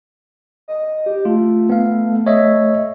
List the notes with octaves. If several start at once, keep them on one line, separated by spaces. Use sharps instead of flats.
D#5
G4
A3 F4
B3 F5
C#5 D#5 E5